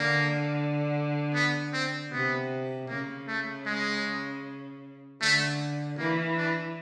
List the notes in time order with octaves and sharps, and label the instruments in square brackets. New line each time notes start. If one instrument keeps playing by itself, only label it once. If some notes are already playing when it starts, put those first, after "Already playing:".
Already playing: [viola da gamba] D3 [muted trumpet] A#3
[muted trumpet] B3
C4
[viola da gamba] C3 [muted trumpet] B3
[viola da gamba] C#3 [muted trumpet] A#3
[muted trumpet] A3
G#3
[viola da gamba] D3 [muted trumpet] A3
[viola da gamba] E3 [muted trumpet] A#3
[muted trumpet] D4